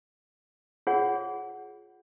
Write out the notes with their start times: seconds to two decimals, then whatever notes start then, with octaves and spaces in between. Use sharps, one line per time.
0.87 F4 G#4 C#5 F#5